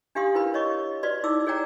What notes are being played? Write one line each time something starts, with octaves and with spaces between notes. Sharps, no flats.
D4 G4 F5 C6 D#6
E4 A#4 B4 B5
C#5 D#5 C#6
F#4 B4 D5 C6
D#4 E4 D6 E6
G#4 C#5 D5 F#5 G5 A#5